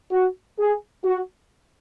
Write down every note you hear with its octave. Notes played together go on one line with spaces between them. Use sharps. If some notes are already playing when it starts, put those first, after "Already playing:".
F#4
G#4
F#4